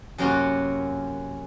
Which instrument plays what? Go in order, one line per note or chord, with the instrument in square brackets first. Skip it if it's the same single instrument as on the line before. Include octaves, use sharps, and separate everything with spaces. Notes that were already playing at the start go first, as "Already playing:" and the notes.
[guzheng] F#2 C3 A#3 C#4 F4 F#4